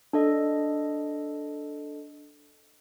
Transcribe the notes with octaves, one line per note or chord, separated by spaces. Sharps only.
D4 A4 D#5